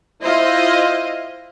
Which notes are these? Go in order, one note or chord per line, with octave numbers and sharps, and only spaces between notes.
E4 F4 C5 D#5 E5